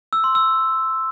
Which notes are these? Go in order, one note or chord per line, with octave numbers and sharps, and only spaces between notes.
E6
C6
E6